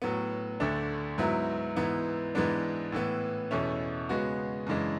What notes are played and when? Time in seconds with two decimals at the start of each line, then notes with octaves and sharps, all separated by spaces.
0.02 A2 F#3 B3
0.60 D2 D3 A3 D4
1.18 G#2 F#3 B3 E4
1.76 G#2 E3 B3 E4
2.35 G#2 E3 G#3 B3 D4
2.92 A2 E3 B3
3.51 E2 B2 A3 C#4 E4
4.09 C#3 G#3 B3 F#4
4.67 F#2 C#3 E3 G#3 D4